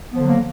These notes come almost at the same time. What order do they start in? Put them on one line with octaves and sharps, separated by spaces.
B3 F3 D3 F#3 A#3